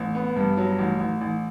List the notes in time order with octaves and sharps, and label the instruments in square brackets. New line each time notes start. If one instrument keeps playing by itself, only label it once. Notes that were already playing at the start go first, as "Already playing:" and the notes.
Already playing: [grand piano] A1
B3
G2
F#3
A1
A1
A1